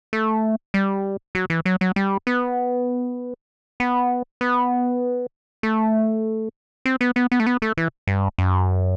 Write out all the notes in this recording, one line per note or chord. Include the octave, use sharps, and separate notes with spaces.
A3
G3
F#3
E3
F#3
F#3
G3
B3
B3
B3
A3
C4
B3
B3
B3
A3
B3
A3
E3
G2
F#2